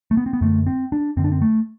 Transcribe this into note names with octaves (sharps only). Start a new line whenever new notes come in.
A3
B3
C4
B3
F#2 D3 A3
C4
D4
F#2 D3 C4
D4
C4
A3